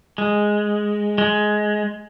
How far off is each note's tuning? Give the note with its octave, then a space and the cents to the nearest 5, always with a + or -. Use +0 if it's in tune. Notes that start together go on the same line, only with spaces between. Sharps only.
G#3 +0
G#3 +15